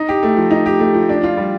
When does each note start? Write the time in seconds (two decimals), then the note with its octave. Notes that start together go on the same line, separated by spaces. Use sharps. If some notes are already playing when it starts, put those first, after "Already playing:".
Already playing: D#4
0.09 G4
0.23 A3
0.37 F3
0.51 D#4
0.66 G4
0.79 A3
0.94 F3
1.09 D4
1.23 F4
1.37 G3